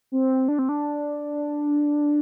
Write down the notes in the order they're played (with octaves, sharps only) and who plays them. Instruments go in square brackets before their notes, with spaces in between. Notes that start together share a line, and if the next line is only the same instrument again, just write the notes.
[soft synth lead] C4
D4
C4
D4